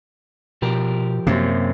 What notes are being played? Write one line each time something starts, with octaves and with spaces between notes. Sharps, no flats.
B2 F3 G4 A#4
F#2 C3 A#3